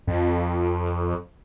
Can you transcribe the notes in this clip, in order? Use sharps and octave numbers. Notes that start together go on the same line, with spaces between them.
F2